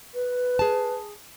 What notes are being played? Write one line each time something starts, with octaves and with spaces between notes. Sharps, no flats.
B4
G#4 A5